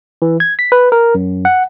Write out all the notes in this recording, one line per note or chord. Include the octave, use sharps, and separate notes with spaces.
E3
G#6
B6
B4
A#4
F#2
F#5